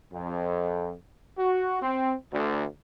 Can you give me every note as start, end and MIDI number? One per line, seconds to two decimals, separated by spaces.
0.12 0.92 41
1.37 1.81 66
1.82 2.13 60
2.33 2.64 38